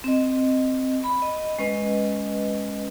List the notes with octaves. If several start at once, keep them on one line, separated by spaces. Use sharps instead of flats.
C4 D#5
B5
D#5
G#3 C#4 B4 D#5